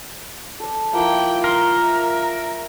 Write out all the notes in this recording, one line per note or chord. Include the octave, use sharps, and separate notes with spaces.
A4 D5
F3 A#3 E4 G5 A#5
A#4 C6
E5